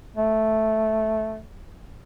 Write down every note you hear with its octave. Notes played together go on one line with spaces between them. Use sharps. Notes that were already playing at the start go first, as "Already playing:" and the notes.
A3